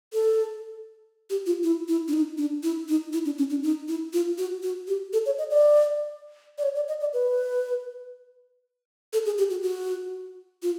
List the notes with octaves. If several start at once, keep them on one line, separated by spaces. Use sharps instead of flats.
A4
G4
F4
E4
E4
D4
D#4
D4
E4
D#4
E4
D4
C#4
D4
D#4
E4
F4
F#4
F#4
G4
A4
C#5
D#5
D5
D5
C#5
D5
D#5
D5
B4
A4
G#4
G4
F#4
F#4
F4